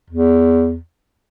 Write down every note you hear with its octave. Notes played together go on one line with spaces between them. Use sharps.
E2